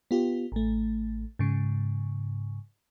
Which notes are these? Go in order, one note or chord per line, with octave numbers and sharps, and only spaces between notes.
B3 F4 G4
A1 A3
G#2 C#3